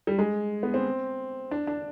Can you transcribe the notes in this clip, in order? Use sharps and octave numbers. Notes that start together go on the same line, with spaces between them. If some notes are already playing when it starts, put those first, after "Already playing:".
G3
G#3
B3
C4
D4
D4